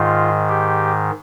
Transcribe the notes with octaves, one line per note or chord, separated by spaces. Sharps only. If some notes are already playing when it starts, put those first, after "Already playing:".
Already playing: G#2 D#3 F4
G4